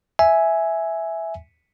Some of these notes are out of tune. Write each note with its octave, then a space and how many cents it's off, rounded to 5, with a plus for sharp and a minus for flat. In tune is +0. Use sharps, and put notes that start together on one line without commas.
E5 -5 G#5 +5